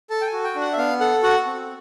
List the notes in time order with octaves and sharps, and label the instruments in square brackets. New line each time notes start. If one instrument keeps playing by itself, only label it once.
[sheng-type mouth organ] A4 A5
G5
G#5
F#4
G5
D4
F#5
E5
B3 F5
A4 F#5
F#4 F#5
C4